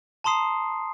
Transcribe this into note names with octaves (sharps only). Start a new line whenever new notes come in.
A5 A#5 C6 D#6 C7